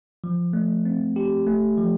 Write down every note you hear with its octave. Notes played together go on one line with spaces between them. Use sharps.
F3
A3
C4
G4
A3
F3